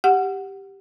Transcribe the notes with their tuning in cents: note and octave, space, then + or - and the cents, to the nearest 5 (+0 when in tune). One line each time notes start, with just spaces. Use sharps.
G4 +0 F#5 +0